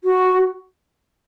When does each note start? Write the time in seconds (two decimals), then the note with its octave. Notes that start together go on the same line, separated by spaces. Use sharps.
0.04 F#4